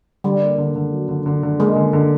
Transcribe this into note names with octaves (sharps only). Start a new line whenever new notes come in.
D3 G3
A#3
D3
D3
F#3
D3
D3
D3
G#3 A#3
D3
D3